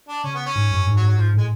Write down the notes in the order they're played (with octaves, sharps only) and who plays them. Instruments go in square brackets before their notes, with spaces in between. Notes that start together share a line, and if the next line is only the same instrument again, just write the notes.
[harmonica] D4
[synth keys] C#3 [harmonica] C#4
[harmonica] B3
C#4
[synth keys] G#2
F#2
G#2
[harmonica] F#3
[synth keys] G#2
[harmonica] F#3
[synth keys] G#2 [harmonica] F3
[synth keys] A2 [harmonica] G#3